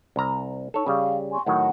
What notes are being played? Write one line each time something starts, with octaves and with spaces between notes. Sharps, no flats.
C2 A#5
D#4 A4 C#5
C#3 G3 F5
G#5 C6 C#6
A2 D#3 F#3 F#5